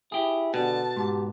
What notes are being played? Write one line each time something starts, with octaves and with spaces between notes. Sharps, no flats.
E4 G4 G#4
B2 D3 A5
G#2 G4